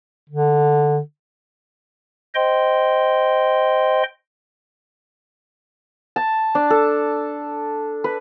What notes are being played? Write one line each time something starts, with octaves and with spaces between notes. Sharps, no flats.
D3
C5 D#5 G5 C6
A5
D4
A4
B4